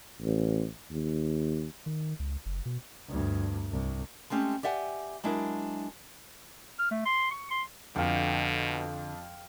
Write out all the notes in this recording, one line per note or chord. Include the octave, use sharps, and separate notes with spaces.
A1
D#2
D#3
C#2
F#1
B2
D2 G2
C2
G#3 A3 C4 C#4 G4
G4 D5 E5 F#5 G#5
F#3 G#3 D4 E4 A#4
F6
A3
C6
C#6
C6
F2 B2 D3 F5 G5